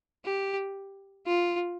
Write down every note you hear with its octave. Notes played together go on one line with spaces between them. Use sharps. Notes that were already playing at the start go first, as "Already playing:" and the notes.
G4
F4